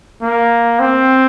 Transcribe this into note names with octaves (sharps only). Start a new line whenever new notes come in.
A#3
C4